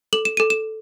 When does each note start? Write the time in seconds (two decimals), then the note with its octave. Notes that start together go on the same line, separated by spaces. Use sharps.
0.13 A4 F#7
0.25 E7
0.37 A4 D#7
0.50 E7